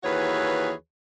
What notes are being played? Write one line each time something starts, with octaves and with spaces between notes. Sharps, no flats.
D#2 E3 F#4 G#4 B4 C#5